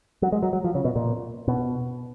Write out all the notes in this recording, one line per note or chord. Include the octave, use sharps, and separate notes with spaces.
F#3
G#3
F#3
F#3
F3
C#3
B2
A#2
B2